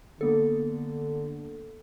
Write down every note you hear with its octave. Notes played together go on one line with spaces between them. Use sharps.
D3 A#3 B3 A4